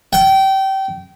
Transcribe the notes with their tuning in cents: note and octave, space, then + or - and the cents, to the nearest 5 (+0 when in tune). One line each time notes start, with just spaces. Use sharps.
G5 -25